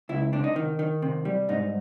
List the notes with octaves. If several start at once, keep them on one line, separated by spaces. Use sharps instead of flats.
C#2 E4
C3 D4
D#4
D#3
D#3
C3
G3
G#2 D#4